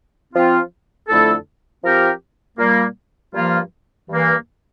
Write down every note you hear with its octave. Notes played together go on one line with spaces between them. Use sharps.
F3 C4 F4
F2 D3 A3 E4 A4
F3 C4 G4 A#4
A#2 G3 A#3
G2 F3 A#3 F4
G2 E3 A#3